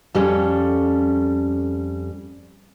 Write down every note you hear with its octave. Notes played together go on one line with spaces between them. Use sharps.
F2 G3 C#4 A4 C#5